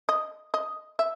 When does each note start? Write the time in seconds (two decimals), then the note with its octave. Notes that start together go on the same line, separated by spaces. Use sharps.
0.09 D#5
0.54 D#5
0.99 E5